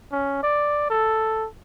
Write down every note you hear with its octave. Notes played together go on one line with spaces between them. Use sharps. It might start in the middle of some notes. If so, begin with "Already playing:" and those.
C#4
D5
A4